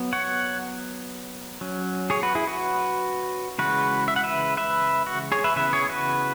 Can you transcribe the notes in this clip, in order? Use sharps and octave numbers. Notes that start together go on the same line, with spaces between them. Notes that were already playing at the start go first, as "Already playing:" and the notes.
Already playing: F#3 B3
C#5 F#5
F#3 C#4
G#4 C#5
F#4 B4
E4 G#4
F#4 B4
C#3 E3 G#3 F#4 B4
E5
F#5
B4 E5
B4 E5
F#4
G#4 C#5
B4 E5
C#3 E3 B3 B4 E5
G#4 C#5
F#4 B4